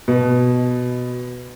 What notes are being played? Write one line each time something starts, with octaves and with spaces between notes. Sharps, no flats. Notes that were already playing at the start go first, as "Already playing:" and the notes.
B2